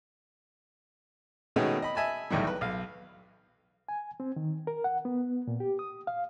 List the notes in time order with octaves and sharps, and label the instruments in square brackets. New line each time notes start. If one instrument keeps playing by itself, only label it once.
[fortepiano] B2 D#3 G#3 A3 B3 C#4
D#5 B5
D#5 E5 G#5 A5 B5
B1 E2 A2 D#3 G3
B4
B1 F5
[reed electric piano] G#5
C4
D#3
A#4
F#5
B3
A#2
G4
D#6
F5